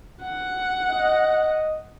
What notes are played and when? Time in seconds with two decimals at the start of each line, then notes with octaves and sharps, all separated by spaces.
0.23 F#5
0.88 D#5